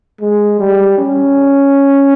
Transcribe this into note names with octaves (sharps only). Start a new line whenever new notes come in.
G#3
G3
C#4